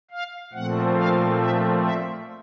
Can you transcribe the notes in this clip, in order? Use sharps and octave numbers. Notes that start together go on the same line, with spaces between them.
F5
A#2 F3 A3 C4 F#5
F5
E5
E5